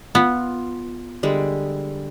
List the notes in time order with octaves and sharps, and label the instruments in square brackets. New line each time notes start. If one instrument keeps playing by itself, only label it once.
[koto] B3 [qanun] F4
[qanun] D3 G3 G#3